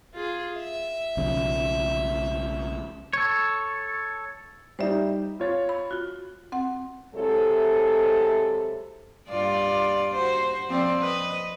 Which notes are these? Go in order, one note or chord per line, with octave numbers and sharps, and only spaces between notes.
F4 G#4
E5
B1 C#3 F3
A4 C#5
G3 D#4 C5 E5
F4 C#5 A6
B5
F4 F#4 F#6
C4 F#5
C3 F#3 G#3 E4 A4
G2 F4 D5
F#4 C5
F3 C4 D5
B4 D#5